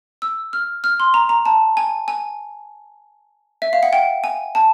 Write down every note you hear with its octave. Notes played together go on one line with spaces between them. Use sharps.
E6
F6
F6
C6
A#5
A#5
A5
G#5
G#5
E5
F5
F#5
G5
G#5
A5